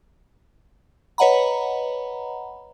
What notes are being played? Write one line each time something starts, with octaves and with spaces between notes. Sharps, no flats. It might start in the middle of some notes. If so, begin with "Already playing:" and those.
B4 C#5 D#5 F#5 A#5 B5